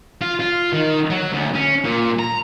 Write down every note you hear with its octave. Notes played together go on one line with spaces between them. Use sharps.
F4
F4
D#3
F#3
D2
C#4
A#2
A#5